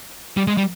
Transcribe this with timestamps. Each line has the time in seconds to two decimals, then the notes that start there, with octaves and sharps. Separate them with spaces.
0.37 G3
0.47 G#3
0.57 G3